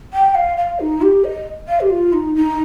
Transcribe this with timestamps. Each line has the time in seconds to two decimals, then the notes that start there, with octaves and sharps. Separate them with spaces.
0.13 G5
0.35 F5
0.57 F5
0.80 D#4
1.02 G4
1.24 D#5
1.68 F5
1.80 G4
1.90 F4
2.13 D#4
2.35 D#4